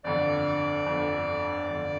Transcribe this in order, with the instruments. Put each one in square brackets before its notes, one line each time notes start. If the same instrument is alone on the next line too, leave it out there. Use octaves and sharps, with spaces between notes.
[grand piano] G1 F2 D3 [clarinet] D5
[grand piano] G1 F2 D3
G1 F2 D3